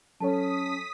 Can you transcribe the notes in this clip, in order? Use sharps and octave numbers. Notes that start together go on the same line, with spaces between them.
F#3 C#4 A4 C#5 A5 D#6 B6